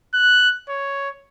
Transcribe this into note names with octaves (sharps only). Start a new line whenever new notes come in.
F#6
C#5